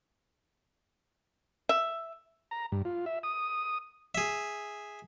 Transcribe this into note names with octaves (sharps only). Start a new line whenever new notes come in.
E5
A#5
G2
F4
E5
D#6
G#4 E5